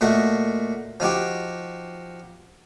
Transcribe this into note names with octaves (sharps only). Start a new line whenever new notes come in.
A#2 A3 F#4 D#5
F3 D#4 F#4 G4